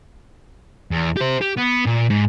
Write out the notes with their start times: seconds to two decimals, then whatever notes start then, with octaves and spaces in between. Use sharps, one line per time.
0.91 E2
1.16 G4 C5
1.41 G4
1.57 B3
1.86 A#2
2.10 G#2